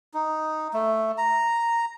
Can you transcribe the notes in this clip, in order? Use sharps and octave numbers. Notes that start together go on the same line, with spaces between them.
D#4
A3
A#5